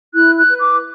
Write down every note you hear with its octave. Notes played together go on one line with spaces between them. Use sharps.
E4 F#6
F#6
B4
D6